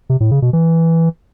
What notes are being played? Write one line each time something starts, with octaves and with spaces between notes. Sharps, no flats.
C3
A2
C#3
B2
E3